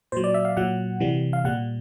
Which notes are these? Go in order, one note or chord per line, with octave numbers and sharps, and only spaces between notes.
A#2 F#3 C5
D5
E5
F5
A#2 F#3 F#5
C3 E3 G3
F5
A#2 G3 F#5